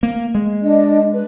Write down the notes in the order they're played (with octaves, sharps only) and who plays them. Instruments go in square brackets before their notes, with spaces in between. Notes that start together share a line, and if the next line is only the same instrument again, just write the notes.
[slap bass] A#3
G#3
[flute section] D4 D#5
B4